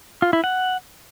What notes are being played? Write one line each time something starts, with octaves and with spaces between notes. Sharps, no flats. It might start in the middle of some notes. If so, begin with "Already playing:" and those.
F4
E4
F#5